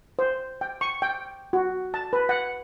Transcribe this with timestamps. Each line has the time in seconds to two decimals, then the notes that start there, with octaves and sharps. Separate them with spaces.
0.19 C5
0.61 G5
0.81 C#6
1.02 G5
1.53 F#4
1.94 A5
2.13 B4
2.29 F#5